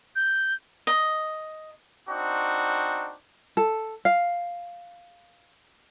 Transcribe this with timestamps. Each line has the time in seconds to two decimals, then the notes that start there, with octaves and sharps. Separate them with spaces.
0.16 G6
0.87 D#5
2.10 C4 D4 D#4 F#4
3.57 A4
4.05 F5